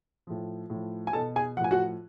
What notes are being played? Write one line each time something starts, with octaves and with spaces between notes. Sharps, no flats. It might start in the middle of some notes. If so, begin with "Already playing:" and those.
A2 F3
A2 F3
G#5
B2 A4 A5
G#4 G#5
A2 F3 F#5 G#5
F#4 F#5